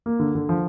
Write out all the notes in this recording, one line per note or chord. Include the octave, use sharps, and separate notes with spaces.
A#3
D3
D3
F3